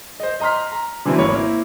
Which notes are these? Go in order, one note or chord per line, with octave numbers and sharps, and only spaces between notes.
C5 D#5
D#5 A#5 C6 F6 B6
A#5
D3 E3 F#3 A#3 C4 E4
G#1 A#3 C#5 B5
A#3 C4 E4